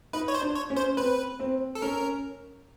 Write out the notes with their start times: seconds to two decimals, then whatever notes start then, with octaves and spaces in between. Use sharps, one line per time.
0.13 D#4 B4
0.28 C#5
0.35 C5
0.41 D4
0.55 C#5
0.70 C#4
0.77 C5
0.97 C4 B4
1.40 C4
1.75 A4
1.82 C#4 A#4